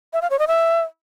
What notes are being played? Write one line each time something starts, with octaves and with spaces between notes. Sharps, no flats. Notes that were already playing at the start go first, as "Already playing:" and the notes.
E5
F5
C#5
D#5
E5